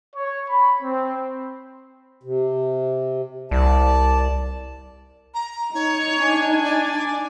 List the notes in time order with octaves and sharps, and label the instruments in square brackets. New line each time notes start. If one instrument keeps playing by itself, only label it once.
[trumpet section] C#5
B5
C4
[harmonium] C3
[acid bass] C2 [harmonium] D5 A5
[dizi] A#5
[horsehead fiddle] D#4 [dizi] C#5
[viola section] D4 G#5
[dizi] D5